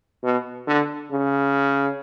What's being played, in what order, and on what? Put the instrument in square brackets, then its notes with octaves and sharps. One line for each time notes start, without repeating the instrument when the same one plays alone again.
[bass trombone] B2
D3
C#3